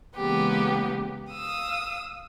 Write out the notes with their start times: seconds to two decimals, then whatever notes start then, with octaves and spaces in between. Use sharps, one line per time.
0.17 C#3 E3 G#3 A#3 B3 G4
1.31 F5 D#6 E6